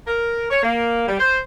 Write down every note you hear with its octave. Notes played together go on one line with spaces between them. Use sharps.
A#4
C#5
A#3
G3
C5